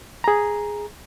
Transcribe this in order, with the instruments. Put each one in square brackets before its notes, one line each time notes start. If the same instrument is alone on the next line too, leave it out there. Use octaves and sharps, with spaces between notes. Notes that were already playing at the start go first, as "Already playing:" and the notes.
[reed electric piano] G#4 A#5